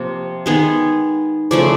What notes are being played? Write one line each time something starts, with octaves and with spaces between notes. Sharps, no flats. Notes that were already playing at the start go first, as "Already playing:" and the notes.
Already playing: C3 F3 A#3
D#3 G#3 B3 G#4
C#3 F3 A3 D5